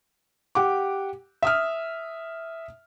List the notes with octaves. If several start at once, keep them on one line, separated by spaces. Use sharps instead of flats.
G4 F#5 D6
E5 D#6 F6